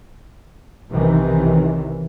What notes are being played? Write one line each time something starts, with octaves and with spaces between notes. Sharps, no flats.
B1 C3 D#3 E3